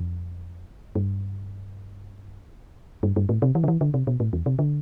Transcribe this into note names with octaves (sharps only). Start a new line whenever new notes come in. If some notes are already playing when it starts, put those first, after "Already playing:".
Already playing: F2
G2
G2
G2
A2
C3
E3
D3
E3
D3
C3
B2
A2
E2
C3
D3